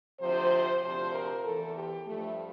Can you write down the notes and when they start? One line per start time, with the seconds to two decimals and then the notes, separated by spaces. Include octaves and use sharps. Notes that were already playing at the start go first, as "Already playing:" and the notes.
0.20 D2 C3 F3 C5
0.83 D2 C3 F3 C5
1.14 A#4
1.45 E2 E3 A4
1.75 G4
2.07 G2 F3 A3